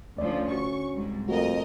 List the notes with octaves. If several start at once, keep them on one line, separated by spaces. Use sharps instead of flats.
D2 F3 C#4 D5
F#4 C#6
C2 G#2
F2 A3 F#4 A#4 D#5